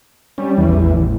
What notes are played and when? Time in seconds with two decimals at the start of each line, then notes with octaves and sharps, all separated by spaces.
0.38 G3 C#4
0.57 E2
0.69 A1